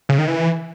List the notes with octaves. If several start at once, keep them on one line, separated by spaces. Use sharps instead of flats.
C#3
D#3
E3